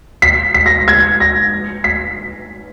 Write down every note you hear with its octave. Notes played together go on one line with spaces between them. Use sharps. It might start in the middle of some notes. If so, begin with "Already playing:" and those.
B6
B6
A#6
G#6
A#6
B6